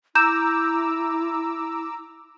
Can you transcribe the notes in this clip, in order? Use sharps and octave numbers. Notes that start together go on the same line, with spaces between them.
E4 A#5 D6 E6 G6 E7